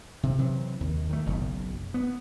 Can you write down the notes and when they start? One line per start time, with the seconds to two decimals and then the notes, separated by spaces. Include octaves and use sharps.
0.23 C3
0.38 C3 E3 F#3
0.81 D#2
1.09 D#3 F#3 A3
1.26 F#1 B1 F#2
1.94 B3